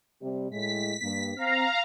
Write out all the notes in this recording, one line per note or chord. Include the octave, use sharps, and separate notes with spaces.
C3 G3
A2 G#3 B6
G2 A#3
C4 F5 A#5